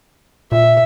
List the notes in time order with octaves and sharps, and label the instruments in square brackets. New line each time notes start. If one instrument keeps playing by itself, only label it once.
[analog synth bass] A#2 [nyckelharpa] E5